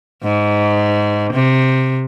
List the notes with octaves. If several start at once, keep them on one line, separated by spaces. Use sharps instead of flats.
G#2
C3